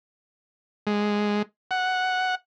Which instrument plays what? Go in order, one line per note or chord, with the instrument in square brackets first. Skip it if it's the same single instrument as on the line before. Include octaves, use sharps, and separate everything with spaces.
[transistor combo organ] G#3
F#5